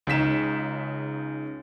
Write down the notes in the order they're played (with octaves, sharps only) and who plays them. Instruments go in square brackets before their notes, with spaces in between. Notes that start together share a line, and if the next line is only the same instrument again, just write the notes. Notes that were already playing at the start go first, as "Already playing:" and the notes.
[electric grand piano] C#2 C#3 D#4 B6 E7